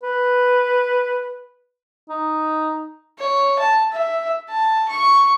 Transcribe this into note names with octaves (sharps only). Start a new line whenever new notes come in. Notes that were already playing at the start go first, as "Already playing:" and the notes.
B4
D#4
C#5
A5
E5
A5
C#6